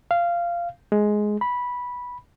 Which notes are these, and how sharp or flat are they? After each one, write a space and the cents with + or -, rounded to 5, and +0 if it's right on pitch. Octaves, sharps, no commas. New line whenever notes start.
F5 -15
G#3 +10
B5 -10